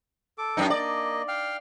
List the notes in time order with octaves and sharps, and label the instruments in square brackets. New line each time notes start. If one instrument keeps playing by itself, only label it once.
[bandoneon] A4 D6
[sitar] F#2 D#4
[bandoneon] A#3 D#5 [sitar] D5
[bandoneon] F5 G5 F6